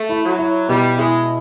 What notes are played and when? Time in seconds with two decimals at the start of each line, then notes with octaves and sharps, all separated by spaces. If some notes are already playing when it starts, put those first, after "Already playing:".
Already playing: A3
0.09 E4
0.25 F#3
0.39 E4
0.69 B2 G3
0.98 G#3 E4